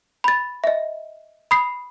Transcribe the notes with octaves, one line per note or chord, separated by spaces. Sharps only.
B5 A6
D#5 E5
B5 D#6 C7